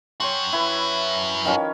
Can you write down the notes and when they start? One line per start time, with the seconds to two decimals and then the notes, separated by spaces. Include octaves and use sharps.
0.20 F#2 F#4 C#5 G5 C6
0.53 E4 B4
1.45 D#3 F3 C#4